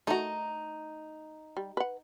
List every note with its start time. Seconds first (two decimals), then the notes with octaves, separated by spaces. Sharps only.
0.07 A3 D#4 F#4 A#5
1.57 G3
1.77 B4 F#5